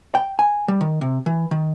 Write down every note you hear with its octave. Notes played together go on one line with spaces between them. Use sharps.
G5
G#5
G3
D#3
C3
E3
D#3